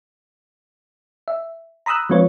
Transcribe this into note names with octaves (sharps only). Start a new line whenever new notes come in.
E5
A#5 B5 D#6 E6 F#6
F3 G#3 C4 F4 B4 C#5